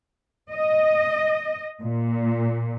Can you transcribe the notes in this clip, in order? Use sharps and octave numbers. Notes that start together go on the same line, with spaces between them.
D#5
A#2